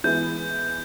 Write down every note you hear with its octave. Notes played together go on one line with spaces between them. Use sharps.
E3 G#3 B3 E4 G6